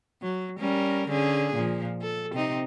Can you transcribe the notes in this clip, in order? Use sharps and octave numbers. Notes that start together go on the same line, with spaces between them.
F#3
G3 C#4 A#4
D3 C#4 G#4
A#2 F3
A4
C3 C4 D#4